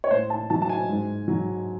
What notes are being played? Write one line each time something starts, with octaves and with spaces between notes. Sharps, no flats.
C#5
A2 C5
A5
F#3 A5
A5
G#5
G#2
F#3